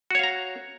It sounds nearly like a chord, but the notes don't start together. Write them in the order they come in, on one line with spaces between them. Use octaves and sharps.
F#4 C#5 F5 A#5